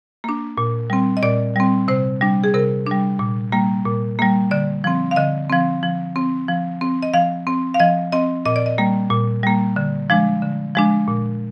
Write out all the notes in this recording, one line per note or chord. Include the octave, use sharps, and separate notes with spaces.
A#3 D4
A#2
G3 C4
D#5
A#2 D5
G3 C4
C3 C5
G3 D4
G#4
C3 A#4
G3 D4
A#2
G3 A#3
A#2
G3 A#3
D3 D5
F3 C4
F5
D3 D#5
F3 C4
F3
C4
F3
C4
D#5
F3 F5
C4
F5
F3 D#5
C4 D#5
A#2 D#5
D5
D#5
G3 A#3
A#2
G3 A#3
D3
F3 G#3 D4
D3
F3 G#3 D4
A#2